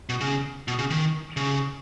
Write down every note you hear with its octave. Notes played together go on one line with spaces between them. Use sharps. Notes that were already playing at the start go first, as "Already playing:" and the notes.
B2
C#3
B2
C#3
D#3
C#3